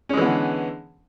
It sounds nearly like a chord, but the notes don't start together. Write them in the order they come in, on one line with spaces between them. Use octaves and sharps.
C#4 G#3 E3 B3 D3